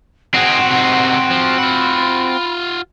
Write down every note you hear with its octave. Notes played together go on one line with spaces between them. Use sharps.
C4 D#4 F#4 G#4 F#5
C3 D#4
F3
F4 F#5 B5